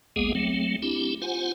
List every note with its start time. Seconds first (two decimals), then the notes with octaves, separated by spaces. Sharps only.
0.16 G#1 D2 G#3 A#3 B3 G#4
0.35 F#3 A3 C4
0.82 C4 D4 E4 G4
1.22 F4 C5 F#5 G#5